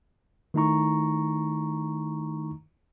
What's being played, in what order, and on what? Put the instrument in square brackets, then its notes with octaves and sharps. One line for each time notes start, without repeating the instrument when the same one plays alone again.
[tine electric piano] D#3 A3 D#4 E4 A#5 C#6